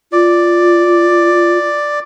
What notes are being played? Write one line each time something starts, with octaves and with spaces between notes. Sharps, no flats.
F4 D5